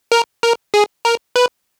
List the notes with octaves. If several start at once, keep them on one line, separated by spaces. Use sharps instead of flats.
A#4
A#4
G#4
A#4
B4